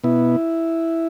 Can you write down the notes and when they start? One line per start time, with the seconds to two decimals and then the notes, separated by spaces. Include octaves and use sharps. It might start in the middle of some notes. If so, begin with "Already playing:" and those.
0.04 B2 B3 E4